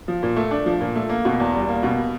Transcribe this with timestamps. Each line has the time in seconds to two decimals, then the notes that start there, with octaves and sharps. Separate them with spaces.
0.08 F3
0.23 A#2
0.36 A3
0.51 D4
0.66 F3
0.81 A#2
0.95 A3
1.09 A#3
1.25 B2
1.40 E2
1.54 G3
1.69 A#3
1.83 B2